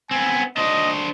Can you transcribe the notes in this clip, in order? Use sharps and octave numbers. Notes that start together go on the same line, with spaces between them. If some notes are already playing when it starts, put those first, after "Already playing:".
B3 C4 G#5
D4 C5 D#5